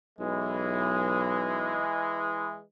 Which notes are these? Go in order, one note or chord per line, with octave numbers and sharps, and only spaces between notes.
B1 E3 G#3